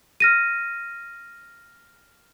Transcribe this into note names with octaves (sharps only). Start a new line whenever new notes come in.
F6 A#6 D#7